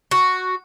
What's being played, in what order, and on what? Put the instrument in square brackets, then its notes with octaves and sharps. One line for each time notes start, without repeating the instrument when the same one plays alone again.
[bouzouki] F#4